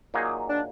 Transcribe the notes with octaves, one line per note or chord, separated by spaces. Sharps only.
A#2 F#3 A#3 D#4 G#4
D4